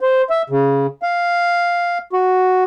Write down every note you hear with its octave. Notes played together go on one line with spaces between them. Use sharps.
C5
E5
C#3
F5
F#4